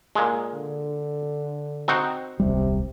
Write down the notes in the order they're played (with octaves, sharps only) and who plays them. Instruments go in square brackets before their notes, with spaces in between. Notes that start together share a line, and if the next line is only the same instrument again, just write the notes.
[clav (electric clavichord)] A#2 G#3
[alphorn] D3
[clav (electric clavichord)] C4 D#4 F#4
[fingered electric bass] D#1 C2 G3 [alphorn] C3